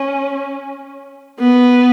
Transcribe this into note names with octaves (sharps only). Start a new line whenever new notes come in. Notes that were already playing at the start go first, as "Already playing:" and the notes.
Already playing: C#4
B3